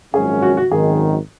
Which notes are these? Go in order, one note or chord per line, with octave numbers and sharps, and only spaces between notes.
G#1 F#2 F3 G#3 C#4 G#4
F#4
F#4
G#1 F#2 D#3 G#4